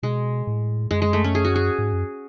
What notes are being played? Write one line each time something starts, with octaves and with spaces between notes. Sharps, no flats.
B2 G#3
A2
F#2 G#3
G#3
A3
C#4
G#4
F#4
G#4
G#2
F#2